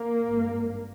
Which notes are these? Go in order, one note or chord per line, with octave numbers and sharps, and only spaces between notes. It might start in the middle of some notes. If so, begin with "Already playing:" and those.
Already playing: A#3
G#1 G2